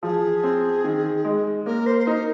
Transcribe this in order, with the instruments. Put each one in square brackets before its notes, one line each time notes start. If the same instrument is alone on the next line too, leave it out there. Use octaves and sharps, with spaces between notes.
[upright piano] F3 [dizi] G#4
[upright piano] C4
D#3
G#3
[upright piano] A#3 [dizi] A#4
[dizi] C5
C5
[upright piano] D#4 [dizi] A#4